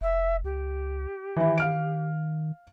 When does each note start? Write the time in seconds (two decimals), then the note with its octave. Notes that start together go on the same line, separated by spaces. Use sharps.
0.01 F1 E5
0.44 C#2 G4
1.36 D#3 E3 E4
1.58 F5 F6 D7